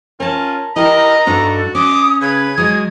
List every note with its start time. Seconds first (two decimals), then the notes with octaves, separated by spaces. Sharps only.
0.20 C#4 F4 A#4 A5
0.76 E4 G4 A#4 D#5 A#5
1.27 G2 D4 D#4 F#4 A4
1.75 C#4 D6 D#6
2.22 C#3 B4 G#6
2.58 F#3 G#3 G#4 D#6